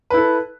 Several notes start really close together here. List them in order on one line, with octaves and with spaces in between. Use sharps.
B4 E4 A4